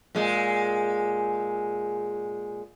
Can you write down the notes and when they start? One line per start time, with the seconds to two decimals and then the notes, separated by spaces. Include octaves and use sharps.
0.15 A#2 G#3